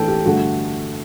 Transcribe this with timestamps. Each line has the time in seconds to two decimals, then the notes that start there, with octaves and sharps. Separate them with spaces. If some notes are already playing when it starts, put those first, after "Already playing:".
Already playing: A2 E3 A3 D4 A4 G5
0.08 G4
0.25 G2 D3 A3 F#4